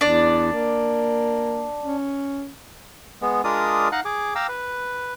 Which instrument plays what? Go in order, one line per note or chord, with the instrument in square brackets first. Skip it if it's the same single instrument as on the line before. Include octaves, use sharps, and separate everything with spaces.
[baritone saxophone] E2 [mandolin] D4 D5
[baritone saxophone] A#3
C#4
[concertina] G#3 B3
G#3 D4 F4 A#4 D5 D#6
D#4 D#5 F5 F#5 F#6
G#4 D6
F5 G5 A#5 D6 E6
B4